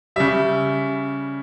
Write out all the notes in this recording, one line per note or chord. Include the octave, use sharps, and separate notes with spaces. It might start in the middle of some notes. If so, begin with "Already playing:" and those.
C#3 G3 E5